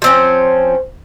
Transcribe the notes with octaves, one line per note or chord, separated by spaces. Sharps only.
F3 C4 C#4